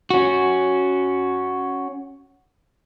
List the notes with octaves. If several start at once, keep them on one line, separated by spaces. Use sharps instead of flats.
C#4 F#4